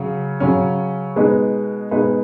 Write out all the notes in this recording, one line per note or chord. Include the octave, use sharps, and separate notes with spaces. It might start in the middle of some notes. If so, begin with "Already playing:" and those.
Already playing: C#3 F#3 C#4
C#3 F#3 C#4
B2 G#3 D#4 B4
B2 G#3 D#4 B4